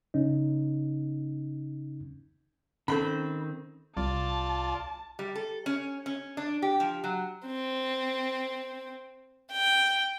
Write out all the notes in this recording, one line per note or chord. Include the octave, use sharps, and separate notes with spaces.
C#3 C#4 D#4
D#3 C4 C#4 A4 C5 B5
C2 F4 D5 A5
G3
A4
C#4
C#4
D4
G4
F3
F#3
C4
G5